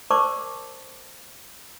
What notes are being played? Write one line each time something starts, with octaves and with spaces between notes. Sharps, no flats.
A#4 C5 D5 A5 C#6 D6